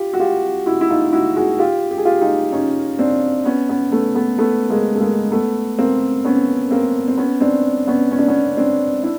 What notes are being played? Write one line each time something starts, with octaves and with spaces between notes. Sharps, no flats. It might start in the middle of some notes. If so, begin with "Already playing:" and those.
Already playing: F4 G4
F#4
F4 G4
E4 F#4
E4
D#4 F4
E4 F#4
F#4 G#4
F4 G4
G4
G#4
F4 G4
D#4 F4
C#4 D#4
C4 D4
B3 C#4
B3 C#4
A3 B3
A3 B3
A3 B3
G#3 A#3
A3
G#3 A#3
A3 B3
A#3 C4
B3 C#4
A#3 C4
C4
B3 C#4
C4 D4
B3 C#4
C#4
D4
B3 C#4
C4 D4
D4 E4